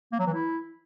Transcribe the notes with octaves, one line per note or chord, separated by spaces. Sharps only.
A#3
F#3
E3
E4